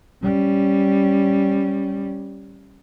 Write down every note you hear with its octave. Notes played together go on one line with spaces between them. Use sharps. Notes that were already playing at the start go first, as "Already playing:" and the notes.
G3 C#4